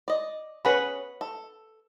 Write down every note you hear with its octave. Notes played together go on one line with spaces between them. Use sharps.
D5 D#5
C#4 G#4 B4 F#5 B5
A4